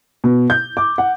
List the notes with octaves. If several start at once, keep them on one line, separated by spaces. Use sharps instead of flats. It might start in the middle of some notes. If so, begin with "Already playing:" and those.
B2
G6
D6
F#5